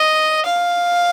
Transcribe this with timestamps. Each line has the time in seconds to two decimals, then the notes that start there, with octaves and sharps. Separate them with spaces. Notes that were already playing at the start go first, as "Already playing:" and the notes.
Already playing: D#5
0.46 F5